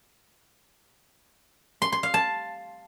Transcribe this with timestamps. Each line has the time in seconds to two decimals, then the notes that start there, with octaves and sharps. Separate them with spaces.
1.82 C6
1.92 C6
2.03 F5
2.14 A5